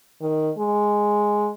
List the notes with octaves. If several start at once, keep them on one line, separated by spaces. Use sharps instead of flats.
D#3
G#3